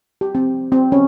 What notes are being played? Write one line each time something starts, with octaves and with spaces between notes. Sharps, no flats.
G4
C4
C4
C#4